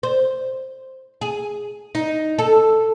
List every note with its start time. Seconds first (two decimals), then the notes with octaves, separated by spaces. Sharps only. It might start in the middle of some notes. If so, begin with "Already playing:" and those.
0.03 C5
1.21 G#4
1.95 D#4
2.38 A4